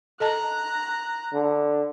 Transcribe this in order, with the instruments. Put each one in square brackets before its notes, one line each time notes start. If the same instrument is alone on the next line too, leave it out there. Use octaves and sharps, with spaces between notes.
[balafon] A4 D#5 A5 [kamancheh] A#5 F#6
[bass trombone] D3